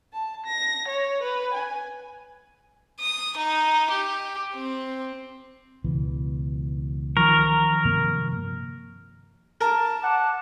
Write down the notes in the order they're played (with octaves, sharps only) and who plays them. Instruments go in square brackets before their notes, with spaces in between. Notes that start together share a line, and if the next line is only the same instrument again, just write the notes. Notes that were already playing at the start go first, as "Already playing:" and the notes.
[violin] A5
A#6
C#5
B4
G#5
D#6
D#4
G4
C4
[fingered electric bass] C#2 B2 E3
[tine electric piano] D#3 F3 C#6 [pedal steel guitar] A#4
[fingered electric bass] G2 C3 A#3
[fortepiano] A#4 [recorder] A5
[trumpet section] F#5 D6